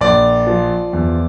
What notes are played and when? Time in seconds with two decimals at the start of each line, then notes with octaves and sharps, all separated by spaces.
0.01 A#1 D5
0.47 F3
0.93 E2